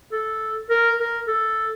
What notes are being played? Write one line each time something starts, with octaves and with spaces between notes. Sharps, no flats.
A4
A#4
A#4
A4